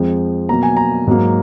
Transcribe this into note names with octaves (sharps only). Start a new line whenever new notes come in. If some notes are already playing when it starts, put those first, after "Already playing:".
Already playing: F2 F3 G#3
B2 F#3 A#3 A#5
G#5
A#5
G#2 F#3 A#3